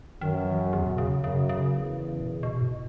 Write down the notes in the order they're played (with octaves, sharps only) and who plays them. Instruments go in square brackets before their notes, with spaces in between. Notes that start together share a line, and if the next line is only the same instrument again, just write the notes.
[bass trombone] F#2 [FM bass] D#3
[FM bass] E3
E2
B2
C#3
[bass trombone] F#2 [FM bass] C#3
[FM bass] C#3
[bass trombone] E2
[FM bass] A#2
B2
B2
G#2